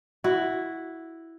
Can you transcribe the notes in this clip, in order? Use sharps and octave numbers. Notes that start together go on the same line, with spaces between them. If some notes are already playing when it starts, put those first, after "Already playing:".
E4 F#4